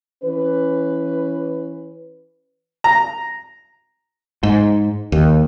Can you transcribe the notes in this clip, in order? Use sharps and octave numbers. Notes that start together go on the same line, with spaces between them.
E3 C#4 B4
A#5
G#2
D#2